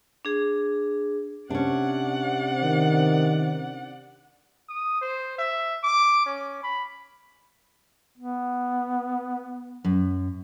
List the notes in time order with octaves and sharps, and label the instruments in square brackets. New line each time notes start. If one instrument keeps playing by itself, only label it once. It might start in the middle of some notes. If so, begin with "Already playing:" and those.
[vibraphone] D4 G#4
[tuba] C3 [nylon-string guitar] C#4 D4 [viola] D5 F#5
[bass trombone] D#3
[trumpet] D#6
C5
E5
D6
C#4
B5
[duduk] B3
[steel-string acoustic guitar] F#2